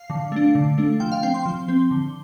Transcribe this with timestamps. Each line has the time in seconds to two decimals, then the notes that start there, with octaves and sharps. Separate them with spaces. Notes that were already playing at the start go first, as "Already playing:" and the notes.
Already playing: F5
0.10 D3
0.32 A3 D4
0.55 D3
0.78 A3 D4
1.00 F3 G5
1.12 F5
1.23 C4 G5
1.34 C6
1.46 F3
1.68 C4
1.91 D3